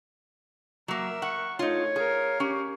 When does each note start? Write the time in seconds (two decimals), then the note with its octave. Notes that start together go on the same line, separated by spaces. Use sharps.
0.88 F#3 A#3 A#4 E5
1.22 F#5 C#6
1.59 A3 D#4 F4 C#5
1.96 G#4 A#4 F5
2.40 C#4 G4